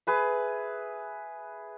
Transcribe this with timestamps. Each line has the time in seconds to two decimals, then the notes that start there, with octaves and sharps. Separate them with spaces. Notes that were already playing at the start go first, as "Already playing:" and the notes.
0.07 G#4 B4 E5